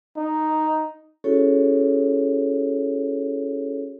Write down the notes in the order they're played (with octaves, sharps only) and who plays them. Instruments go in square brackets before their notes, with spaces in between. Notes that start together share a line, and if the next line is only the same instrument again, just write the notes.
[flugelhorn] D#4
[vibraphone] C#4 E4 F#4 G#4 A4 C#5